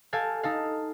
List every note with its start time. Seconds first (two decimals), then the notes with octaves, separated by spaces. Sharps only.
0.13 G4 A4 F5 G#5
0.43 D#4 A4 F5